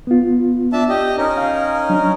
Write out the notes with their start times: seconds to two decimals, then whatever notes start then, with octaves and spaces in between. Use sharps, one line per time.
0.07 B3 F4
0.73 D4 E5 A5
0.89 G4 D#5
1.18 C#4 D#4 A#4
1.37 F5
1.90 F#3 D4